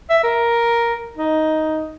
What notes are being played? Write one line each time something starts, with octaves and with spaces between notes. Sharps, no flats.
E5
A#4
D#4